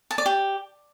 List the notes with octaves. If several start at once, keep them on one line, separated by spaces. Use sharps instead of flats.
A5
D5
G4